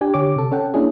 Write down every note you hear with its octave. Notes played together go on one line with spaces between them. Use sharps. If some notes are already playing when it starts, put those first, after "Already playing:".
D4 G4 G#5
D3 G4 C#5 D6
C3 A4
C#4 A4 F#5 G5
A#3 C#4 D4 E4 G#4